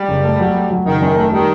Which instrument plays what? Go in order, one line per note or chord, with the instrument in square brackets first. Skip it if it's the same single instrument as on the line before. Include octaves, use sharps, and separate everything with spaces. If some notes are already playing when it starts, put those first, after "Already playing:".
Already playing: [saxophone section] G3
[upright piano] F#1
A3
F#3
A3
F#3
[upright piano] F#1 [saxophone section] D#3
[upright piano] F#2
A3
[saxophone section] D#3 [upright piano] G3